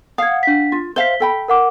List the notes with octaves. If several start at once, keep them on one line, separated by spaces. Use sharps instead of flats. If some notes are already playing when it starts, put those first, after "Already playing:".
F5 F#5 D#6 G#6
D4 B6
F4
C5 E5 F5 B6 G7
A4 G5 B5
A#4 F#5 D6